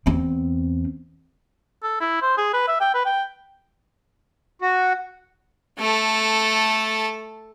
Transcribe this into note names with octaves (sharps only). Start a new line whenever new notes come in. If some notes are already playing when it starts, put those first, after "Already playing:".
E2 C4
A4
E4
C5
G#4
B4
E5
G5
B4
G5
F#4
A3 A4